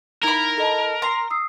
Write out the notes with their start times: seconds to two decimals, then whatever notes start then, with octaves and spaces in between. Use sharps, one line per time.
0.23 D#4 E4 A#4 A#5 B5
0.58 A4 D#5 A5
1.02 A#5 C6 C7
1.30 D#6 E6 C7